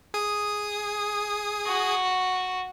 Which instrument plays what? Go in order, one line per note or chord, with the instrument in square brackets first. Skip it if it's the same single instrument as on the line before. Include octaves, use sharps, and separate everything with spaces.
[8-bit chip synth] G#4 D#6
[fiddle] F#4